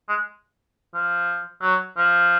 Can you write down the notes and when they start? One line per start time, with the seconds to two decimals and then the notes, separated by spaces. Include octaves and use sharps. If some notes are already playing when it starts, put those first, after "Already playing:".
0.09 G#3
0.94 F3
1.62 F#3
1.97 F3